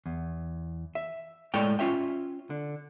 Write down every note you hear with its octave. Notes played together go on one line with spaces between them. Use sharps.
E2
E5
A2 G#3 A4 C#5 D5 G5
C#4 F4 C#5 E5 G5
D3